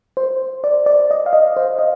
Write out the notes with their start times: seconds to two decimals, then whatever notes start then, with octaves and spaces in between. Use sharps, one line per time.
0.17 C5
0.64 D5
0.86 D5
1.11 D#5
1.26 F5
1.33 D#5
1.57 C5
1.79 D#5